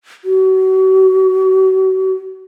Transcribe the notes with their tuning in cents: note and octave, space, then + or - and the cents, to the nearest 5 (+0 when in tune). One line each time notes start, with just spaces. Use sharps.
F#4 +40